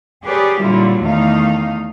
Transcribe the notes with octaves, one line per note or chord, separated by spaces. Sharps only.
G4 G#4 A#4 B4 C#5 D5
A#2 D3 F#3 G3 E4 F4
E2 D#3 A3 D#4 F5